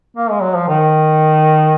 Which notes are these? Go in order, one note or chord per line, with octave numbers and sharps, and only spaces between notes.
A#3
G#3
F#3
F3
D#3